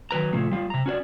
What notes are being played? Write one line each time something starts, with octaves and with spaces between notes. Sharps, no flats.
D#3 F#3 B4 A#5
A#2 C#3 F3 A3
G3 F4 F5
C3 A#5
C#4 F#4 C5 D5